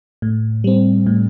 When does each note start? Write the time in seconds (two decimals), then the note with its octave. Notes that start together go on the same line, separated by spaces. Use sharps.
0.22 A2
0.64 G3 C4
1.07 A2